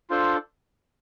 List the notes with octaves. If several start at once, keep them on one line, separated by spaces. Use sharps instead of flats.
D4 F4 A4 C5